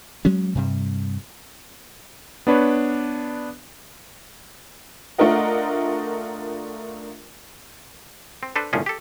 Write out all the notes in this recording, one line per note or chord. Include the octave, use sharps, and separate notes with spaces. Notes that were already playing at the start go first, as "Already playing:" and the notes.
F#3 G#3 C#4
G2 C3 G3
B3 D4 B4 C#5
A3 D4 F4 A#4 D#5 F#5
C4
D4 A4 B4 C5
G1 C2 A2 F3 C#4 G#4
G4 A4